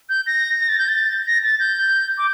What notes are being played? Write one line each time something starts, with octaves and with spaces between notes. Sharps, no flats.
G6
A#6
A#6
A6
G6
A6
A#6
A6
G6
D6